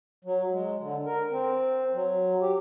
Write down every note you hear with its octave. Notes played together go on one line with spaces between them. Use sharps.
F#3
G#3
D3
A#4
C4
F#3
G4